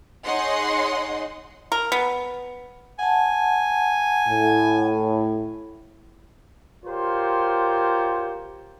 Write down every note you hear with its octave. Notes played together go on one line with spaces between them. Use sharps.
D#4 G#4 C#5 D#5 F#5 C6
A#4
B3
F#5 G#5 A5
A2
F4 G4 A#4 C5 C#5